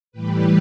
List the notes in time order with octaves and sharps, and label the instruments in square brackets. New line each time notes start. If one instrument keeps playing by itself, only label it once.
[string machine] A2 E3 G3 G4 B4